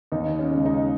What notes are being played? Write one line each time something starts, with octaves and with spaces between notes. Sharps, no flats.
D#2 D#4
C#4
C#3 G#3
D#4